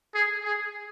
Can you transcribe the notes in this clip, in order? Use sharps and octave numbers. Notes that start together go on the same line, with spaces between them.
G#4
G#4